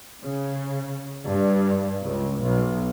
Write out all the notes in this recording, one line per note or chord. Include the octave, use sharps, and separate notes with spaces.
C#3
G2
C#2
B1